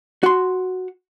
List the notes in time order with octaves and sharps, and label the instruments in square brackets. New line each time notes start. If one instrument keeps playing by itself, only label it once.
[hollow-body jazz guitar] F#4 C6